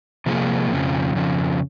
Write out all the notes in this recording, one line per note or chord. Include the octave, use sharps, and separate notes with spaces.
C3 F3 A#3 F4 G#4
F2 C#3 F3
F2 C#3 F3